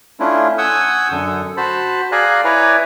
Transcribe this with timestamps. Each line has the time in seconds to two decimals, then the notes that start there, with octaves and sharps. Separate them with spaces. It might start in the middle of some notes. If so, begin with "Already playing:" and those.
0.20 A3 C#4 D4 E4 F4
0.58 F#5 G#5 C#6 D#6 E6 G6
1.11 F#2 D3 A4
1.57 F#4 C5 A5 B5
2.12 G#4 D5 F5 G#5 A#5 F#6
2.45 E4 B4 C#5 D5 G#5 A#5